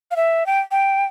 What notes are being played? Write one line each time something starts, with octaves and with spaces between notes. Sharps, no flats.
F5
E5
G5
G5